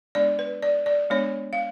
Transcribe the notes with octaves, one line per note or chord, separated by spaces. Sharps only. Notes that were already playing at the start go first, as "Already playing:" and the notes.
G#3 B3 D4 D5
B4
D5
D5
G#3 B3 D4 C#5
F5